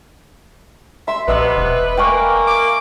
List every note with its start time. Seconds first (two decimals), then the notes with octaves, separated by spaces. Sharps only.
1.08 E5 C6
1.28 A#1 C3 B3 B4 D#5 E5 D6
1.57 E1
1.97 A#3 G5 G#5 C#6
2.47 D6